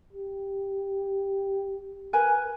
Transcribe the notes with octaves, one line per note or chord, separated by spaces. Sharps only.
G4
A#4 B4 G#5